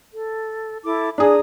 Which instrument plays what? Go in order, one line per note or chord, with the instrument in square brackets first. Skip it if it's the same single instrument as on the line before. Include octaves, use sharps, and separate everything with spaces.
[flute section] A4
E4 A4 D6
[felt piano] D4 G#4 [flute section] G#5 A#5 D#6